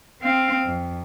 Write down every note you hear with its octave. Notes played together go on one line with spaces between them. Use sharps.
C4 F5
F2